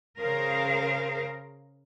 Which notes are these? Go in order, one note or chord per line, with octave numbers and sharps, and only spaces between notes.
C#3 G#4 A#4 C5 F5